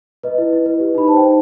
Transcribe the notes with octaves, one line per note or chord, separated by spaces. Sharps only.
B4 D#5
E4
E4
B4
G4
D#4 B5
C5 A5
G5
D#4